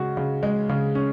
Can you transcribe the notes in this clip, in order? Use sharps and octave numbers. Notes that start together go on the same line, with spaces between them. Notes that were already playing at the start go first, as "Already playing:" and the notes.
Already playing: C#3 G#3 F#4
C#3
G#3
C#3
C#4